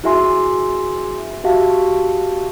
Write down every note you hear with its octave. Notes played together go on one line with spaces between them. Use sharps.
E4 F#4 G#4 E5 G#5 C6
F#4 G4 E5 F5 A5